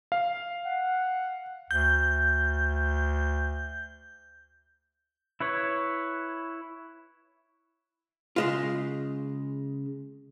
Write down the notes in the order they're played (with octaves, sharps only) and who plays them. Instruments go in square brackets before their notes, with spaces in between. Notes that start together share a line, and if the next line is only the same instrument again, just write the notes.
[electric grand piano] F5
[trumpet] F#5
[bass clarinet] D2 [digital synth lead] G6
[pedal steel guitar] E4 B4 C#5
[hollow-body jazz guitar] C#3 G#3 F4